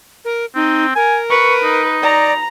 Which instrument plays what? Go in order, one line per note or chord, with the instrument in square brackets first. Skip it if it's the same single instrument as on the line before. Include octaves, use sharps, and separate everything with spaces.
[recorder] A#4
[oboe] C4 [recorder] D#4
[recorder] A#4 [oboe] G#5
[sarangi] B4 [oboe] C#6
[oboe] D#4
[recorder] D5 [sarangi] A#5